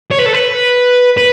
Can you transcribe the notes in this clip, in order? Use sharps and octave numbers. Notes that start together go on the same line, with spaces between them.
C#5
B4
A4
B4
B4